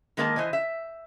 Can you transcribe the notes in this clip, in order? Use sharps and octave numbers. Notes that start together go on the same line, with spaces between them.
D#3 G#3 A#3 A#4 C5 A5
E3 C5 D#5 G#5
E5